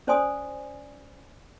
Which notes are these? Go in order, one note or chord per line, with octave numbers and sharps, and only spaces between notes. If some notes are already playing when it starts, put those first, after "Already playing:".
C#4 C5 D5 G#5 C6 D#6